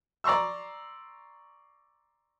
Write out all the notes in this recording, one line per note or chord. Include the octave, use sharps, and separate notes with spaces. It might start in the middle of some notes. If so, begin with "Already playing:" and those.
D5 A#5 C6 C#6 E6